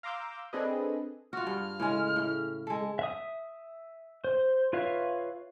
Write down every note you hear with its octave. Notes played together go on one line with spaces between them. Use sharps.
F5 A#5 C6 D6 E6 G6
C4 D4 G#4 A4 B4 D#5
F4 F#4 F6
G2
A2 C#3 G#3
A2
G#3 A4
E5 D#6
C5
F4 B4 C#5 E5 F5